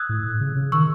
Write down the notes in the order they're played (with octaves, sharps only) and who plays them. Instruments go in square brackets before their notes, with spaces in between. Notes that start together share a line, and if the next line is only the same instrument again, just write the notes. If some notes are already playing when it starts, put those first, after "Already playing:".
Already playing: [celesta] D#6 E6 F#6 G#6
[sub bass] A2
C#3
C#3
[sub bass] D#3 [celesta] C#6 E6